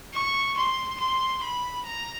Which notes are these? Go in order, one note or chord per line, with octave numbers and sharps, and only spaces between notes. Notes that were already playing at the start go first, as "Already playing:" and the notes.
C#6
C6
C6
B5
A#5